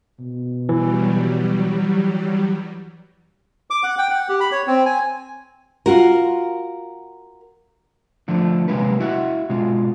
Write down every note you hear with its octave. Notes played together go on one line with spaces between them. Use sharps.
B2
E3 F#3 G3
D6
F#5
G5
F#5
G4
B5
C#5
C4
G#5
F4 F#4 A#4
D3 F3 A3 D4
C3 F#3 G#3 A#3 B4
E4 F#4 E5 F#5
B2 G#3 F4